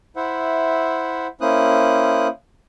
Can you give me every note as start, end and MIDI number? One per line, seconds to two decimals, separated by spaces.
0.16 1.27 64
0.16 1.27 72
0.16 1.27 76
0.16 1.27 78
1.41 2.28 58
1.41 2.28 61
1.41 2.28 64
1.41 2.28 72
1.41 2.28 87
1.41 2.28 90